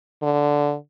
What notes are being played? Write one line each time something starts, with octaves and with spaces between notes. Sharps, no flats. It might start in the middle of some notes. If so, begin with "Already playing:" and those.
D3